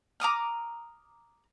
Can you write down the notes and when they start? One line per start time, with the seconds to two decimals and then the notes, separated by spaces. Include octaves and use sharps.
0.20 A#5 D6 D#6 F6